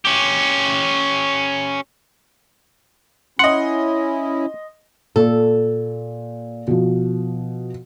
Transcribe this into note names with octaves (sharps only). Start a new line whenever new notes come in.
C#4 G4
C#4 E4 D#5 F#5 C6
A#2 A4
B2 F3